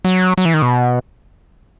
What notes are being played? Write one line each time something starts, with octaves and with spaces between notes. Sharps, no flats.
F#3
F#3
E3
D#3
B2